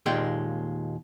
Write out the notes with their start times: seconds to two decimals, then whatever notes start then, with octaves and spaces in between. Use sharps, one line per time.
0.06 D#2 A#2 G#3 G5